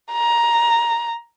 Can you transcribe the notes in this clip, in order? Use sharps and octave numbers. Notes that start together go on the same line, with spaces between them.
A#5